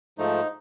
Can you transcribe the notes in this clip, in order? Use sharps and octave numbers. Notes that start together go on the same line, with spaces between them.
G#2 F3 A3 D#4